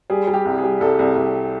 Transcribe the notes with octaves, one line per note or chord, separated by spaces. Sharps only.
G3 G#4
G3
G4
C2
G#4
G3
C2 A4
C2
C2